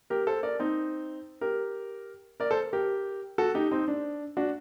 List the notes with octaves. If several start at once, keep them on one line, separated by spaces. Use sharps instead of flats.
G4 A#4
A4 C5
A#4 D5
C4 D#4
G4 A#4
A#4 D5
A4 C5
G4 A#4
F#4 A4
D#4 G4
C4 D#4
D4
D4 F#4